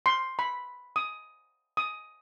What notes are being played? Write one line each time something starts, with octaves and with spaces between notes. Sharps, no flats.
C6
B5
D#6
D#6